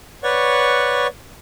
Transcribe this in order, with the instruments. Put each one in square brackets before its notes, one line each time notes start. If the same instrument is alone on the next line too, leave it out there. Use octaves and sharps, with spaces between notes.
[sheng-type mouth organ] B4 C#5 D5 F#5 C#6